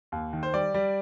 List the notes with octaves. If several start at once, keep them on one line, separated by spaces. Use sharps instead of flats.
D#2
D#3
C5
G3 D5
G3